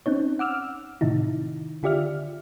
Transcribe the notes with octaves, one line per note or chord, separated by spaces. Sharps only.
C4 C#4 D#4 C#5
F#5 D6 E6 F6
A2 C3 D#3 D#4 E4
D3 F4 G4 D5 E5 F6